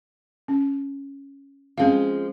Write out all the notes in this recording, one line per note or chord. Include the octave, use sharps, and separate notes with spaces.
C#4
F3 G#3 C4 C#4 F5